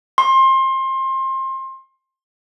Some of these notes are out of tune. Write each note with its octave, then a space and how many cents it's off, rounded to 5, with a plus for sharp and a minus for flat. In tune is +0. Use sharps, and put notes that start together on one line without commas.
C6 +25